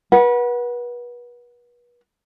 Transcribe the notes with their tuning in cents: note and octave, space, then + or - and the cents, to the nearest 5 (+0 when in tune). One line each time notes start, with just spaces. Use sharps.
B4 -35 F#5 +0